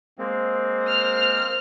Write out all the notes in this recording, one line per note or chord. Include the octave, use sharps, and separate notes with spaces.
G#3 A#3 C4
C5 F6